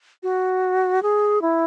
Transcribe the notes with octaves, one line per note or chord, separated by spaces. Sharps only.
F#4
G#4
E4